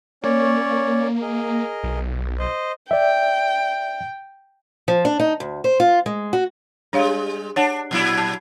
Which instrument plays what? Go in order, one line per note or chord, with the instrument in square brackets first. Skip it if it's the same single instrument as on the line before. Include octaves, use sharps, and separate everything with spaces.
[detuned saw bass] A#3 [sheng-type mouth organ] C#4 C#5 D5
[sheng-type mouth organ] G#4 A#4 D#5
[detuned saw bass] B1
[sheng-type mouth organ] C5 D#5
[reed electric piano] D5 E5 [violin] G5
[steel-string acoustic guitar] F3
D4
D#4
D2
C5
F4
G#3
F#4
[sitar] G3 G#3 [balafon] D4 C#5 F5
[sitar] D4 [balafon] C#5 F#5 A5
[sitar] A#2 F#3 E4
[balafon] A5